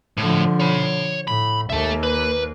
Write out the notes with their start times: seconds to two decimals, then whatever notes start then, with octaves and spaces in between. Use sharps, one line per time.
0.17 A2 D3 F3
0.60 C#5 B5
1.28 A2 B5
1.70 D#2 A#3 A4 E5
2.03 B4